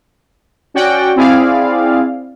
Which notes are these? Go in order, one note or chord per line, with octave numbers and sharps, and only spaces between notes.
C#4 F#4 D5 F#5 G5
C4 E4 G#4 D5 F5